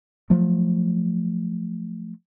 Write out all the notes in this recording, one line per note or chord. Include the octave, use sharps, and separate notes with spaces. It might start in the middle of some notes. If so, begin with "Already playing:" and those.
F3 F#3 A3